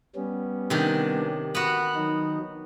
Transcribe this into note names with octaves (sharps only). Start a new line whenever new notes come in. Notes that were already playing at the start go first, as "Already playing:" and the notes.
G3 B3 C#4
C3 D#3 D4
B3 F#4 F#6
D#3 F#3 D#4